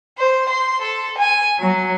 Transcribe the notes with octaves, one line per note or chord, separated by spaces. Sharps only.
C5
C6
A4
G#5
F#3